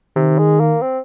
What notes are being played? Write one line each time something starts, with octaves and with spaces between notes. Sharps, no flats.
C3 D#3
G#3
A#3
C4